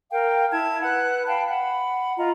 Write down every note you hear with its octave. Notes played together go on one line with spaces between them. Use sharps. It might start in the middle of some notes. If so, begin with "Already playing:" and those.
A#4 F5 G5
E4 A5 G#6
B4 F#5 F#6
F5 G5 A5 B5
F#5 B5
F4 D#5 A#5